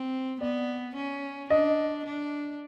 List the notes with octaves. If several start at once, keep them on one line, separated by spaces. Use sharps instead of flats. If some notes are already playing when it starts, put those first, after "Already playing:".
Already playing: C4
B3 D5
C#4
D4 D#5
D4